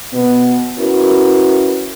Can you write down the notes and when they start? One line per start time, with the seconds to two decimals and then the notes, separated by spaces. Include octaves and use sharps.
0.13 B2 B3
0.78 C#4 E4 F#4 A#4 B4